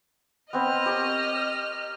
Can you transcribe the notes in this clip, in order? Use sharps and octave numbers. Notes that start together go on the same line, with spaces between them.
B3 C4 D#5 B5 F6
G4 A#4 C#5